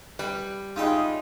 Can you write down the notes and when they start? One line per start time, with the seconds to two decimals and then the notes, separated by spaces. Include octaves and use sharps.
0.19 G3 B4 B5
0.76 C#3 G#3 D#4 F4 G#4 E5 G5